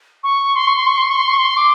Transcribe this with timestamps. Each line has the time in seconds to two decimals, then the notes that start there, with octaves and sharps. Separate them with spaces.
0.24 C#6
0.56 C6
0.67 C#6
0.76 C6
0.87 C#6
0.98 C6
1.08 C#6
1.18 C6
1.29 C#6
1.38 C6
1.57 D6